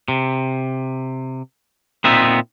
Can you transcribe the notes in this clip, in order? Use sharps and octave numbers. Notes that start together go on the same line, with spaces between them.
C3
A#2 B3 C4 D#4 E5